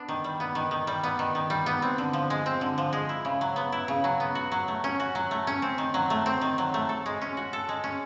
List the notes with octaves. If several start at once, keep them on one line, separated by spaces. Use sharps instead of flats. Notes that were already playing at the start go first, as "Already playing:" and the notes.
Already playing: B3 D4
D#3
G3
B3
D#3
D#3
G3
B3
D#3
D#3
G3
B3
C4
D3
F3
G#3
C4
D3
F3
G#3
E4
C#3
F#3
B3
E4
C#3
F#3
B3
F#4
F#3
A3
C#4
F#4
F#3
A3
C#4
C4
D#3
F#3
A3
C4
D#3
F#3
A3
A4
G#3
C#4
F#4
A4
G#3
C#4